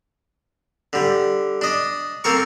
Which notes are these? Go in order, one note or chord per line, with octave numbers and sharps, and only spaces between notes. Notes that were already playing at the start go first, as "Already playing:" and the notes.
D3 G3
D4 D#5
A#3 C4 A4 A#4 C#6